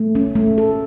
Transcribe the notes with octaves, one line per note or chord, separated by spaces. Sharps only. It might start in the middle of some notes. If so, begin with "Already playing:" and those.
Already playing: A3
C#4
A3
A4